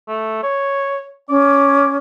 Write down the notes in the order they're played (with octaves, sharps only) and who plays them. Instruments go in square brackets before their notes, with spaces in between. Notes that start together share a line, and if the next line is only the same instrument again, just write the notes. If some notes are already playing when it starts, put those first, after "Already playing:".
[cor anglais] A3
C#5
[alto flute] C#4 [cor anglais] D5